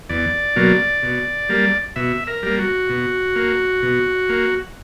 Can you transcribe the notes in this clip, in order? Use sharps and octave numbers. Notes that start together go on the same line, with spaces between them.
E2 D5
B2 F#3 A#3
B2
G3 A#3
B2 E5
A#4
G3 A#3
F#4
B2
A#3
B2
A#3